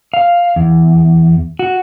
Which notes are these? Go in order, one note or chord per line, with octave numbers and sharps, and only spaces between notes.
F5
E2
F#4